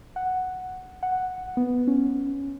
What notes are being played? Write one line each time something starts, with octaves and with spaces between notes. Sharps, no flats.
F#5
F#5
B3
C#4